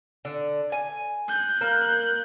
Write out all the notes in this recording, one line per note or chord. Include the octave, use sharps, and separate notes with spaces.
D3
G#5
F#6 G6
A#3